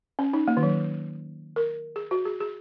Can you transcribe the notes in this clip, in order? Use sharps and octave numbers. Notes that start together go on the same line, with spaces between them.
C#4
D#4
A#3
D#3
F#3
A#4
G#4
F#4
G#4
G#4